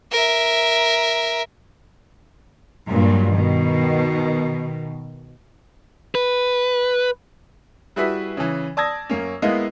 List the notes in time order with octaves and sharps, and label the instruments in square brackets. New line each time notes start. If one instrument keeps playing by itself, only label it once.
[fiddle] A#4 E5
[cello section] G2 A#2 F#3
B2 D#3
[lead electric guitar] B4
[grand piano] G3 E4 F#4 G#4 B4 E5
C#3 E3
D5 A5 D#6 E6 G#6 A#6
F#2 A#3 C#4
G#3 A#3 B3 E4 D#5 F5